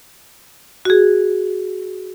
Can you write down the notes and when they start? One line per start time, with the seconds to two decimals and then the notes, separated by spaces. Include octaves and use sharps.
0.85 F#4 G#4